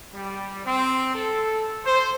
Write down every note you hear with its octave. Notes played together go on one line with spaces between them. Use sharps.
G3
C4
A4
C5